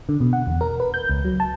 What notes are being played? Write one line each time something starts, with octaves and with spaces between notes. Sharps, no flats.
D3
B2
F#5
E2
A#4
B4
G6
C#2
F#3
A5